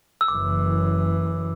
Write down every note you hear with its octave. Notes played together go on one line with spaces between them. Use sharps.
E6
F#1 F#2 E3 D6